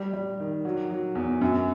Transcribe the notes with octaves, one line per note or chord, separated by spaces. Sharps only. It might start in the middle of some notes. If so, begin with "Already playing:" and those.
Already playing: G3
G3
D#3
F#3
F#3
E2
F#2